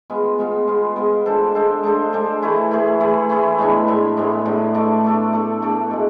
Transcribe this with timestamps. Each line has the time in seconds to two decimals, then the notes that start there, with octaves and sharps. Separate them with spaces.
0.10 G#3 B3 F4
0.39 G#3 B3 F4
0.68 G#3 B3 F4
0.96 G#3 B3 F4
1.26 G#3 D4 A4 C5
1.55 G#3 D4 A4 C5
1.83 G#3 D4 A4 C5
2.13 G#3 D4 A4 C5
2.42 E3 A3 E4 G#4
2.71 E3 A3 E4 G#4
3.00 E3 A3 E4 G#4
3.29 E3 A3 E4 G#4
3.58 A2 G#3 B3 D4
3.87 A2 G#3 B3 D4
4.17 A2 G#3 B3 D4
4.46 A2 G#3 B3 D4
4.74 A3 D4 A4 D5
5.04 A3 D4 A4 D5
5.33 A3 D4 A4 D5
5.62 A3 D4 A4 D5
5.91 B2 G#3